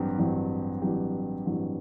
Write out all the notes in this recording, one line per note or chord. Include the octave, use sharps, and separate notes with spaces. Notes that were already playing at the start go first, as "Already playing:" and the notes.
Already playing: A1 G2 F#3 C4 G4
A1 G2 F#3 C4 G4
A1 G2 F#3 C4 G4
A1 G2 F#3 C4 G4